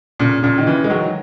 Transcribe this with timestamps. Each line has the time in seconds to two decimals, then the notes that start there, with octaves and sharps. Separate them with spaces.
0.19 A#2 C#3
0.42 A#2 C#3
0.58 D#3
0.66 C#3 E3
0.84 G#3
0.89 D#3 F#3